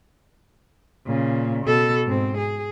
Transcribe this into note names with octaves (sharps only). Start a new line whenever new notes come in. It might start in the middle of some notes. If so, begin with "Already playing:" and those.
A#2 C#3
B2 A4
G#2 C4
G#4